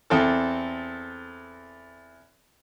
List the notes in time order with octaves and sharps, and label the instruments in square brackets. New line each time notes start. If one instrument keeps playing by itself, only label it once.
[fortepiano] E2 C4 A4